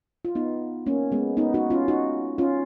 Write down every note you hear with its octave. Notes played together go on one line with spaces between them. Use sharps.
F4
B3 D#4
A#3 C#4
G#3 B3
B3 D#4
D#4 F#4
C#4 F4
D#4 F#4
C#4 F4